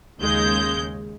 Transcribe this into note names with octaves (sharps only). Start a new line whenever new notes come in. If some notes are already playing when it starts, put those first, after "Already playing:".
D#2 C#3 G#3 G6